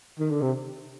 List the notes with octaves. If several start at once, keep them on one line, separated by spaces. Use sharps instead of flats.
D#3
D3
C3